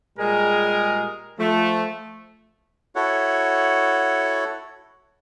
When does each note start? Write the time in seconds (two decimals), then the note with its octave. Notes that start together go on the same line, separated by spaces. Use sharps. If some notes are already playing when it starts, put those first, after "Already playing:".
0.18 A#2 G3 G#3 G#4 A#4
1.39 F3 A3
2.96 E4 F#4 A4 C#5 F#5